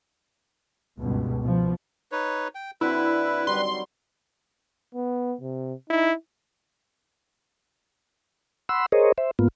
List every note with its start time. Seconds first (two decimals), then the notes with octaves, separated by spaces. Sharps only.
0.98 C#2 G2 B2
1.42 B2 F3
2.12 D#4 B4 C#5
2.55 G5
2.81 D3 C4 E4 F#4 B4
3.47 D#3 F#3 G3 C6
4.95 B3
5.41 C3
5.90 D#4 E4
8.69 F#5 B5 C6 E6
8.92 G#4 A#4 C5 C#5 D#5
9.18 C5 E5
9.39 G#2 A#3 B3 F4